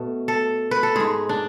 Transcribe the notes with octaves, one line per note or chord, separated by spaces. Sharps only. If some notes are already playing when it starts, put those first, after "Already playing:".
Already playing: B2 A3
A4
B4
A4
G#2 G#3 G#4
D4